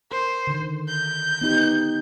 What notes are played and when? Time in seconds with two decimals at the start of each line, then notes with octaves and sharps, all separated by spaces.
0.12 A#4 C5
0.47 D3 D#3
0.88 G6
1.41 B3 D#4 G4